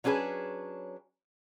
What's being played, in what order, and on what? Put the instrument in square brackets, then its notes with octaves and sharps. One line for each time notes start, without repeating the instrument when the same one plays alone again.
[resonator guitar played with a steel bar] F#3 C#4 D4 G#4 B4